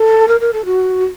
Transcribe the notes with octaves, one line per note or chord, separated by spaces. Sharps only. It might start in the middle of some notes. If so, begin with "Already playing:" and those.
Already playing: A4
A#4
A#4
A4
F#4